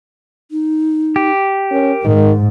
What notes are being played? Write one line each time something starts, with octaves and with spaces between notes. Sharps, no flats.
D#4
G4
C#4 A#4
G#2 D#3